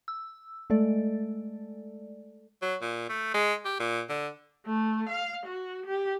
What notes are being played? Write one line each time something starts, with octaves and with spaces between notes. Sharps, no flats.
E6
G#3 A3 A4 D5
F#3
A#2
A3
G#3
G4
A#2
D3
A3
F5
F#4
G4